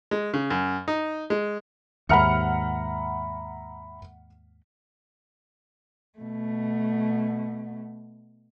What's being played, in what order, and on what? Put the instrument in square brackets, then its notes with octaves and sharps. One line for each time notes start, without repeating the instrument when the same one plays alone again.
[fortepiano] G#3
C#3
F#2
D#4
G#3
[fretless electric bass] D#2 G#2 [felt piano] E5 A#5 B5 [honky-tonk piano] F#5 F6 C#7
[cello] B2 A3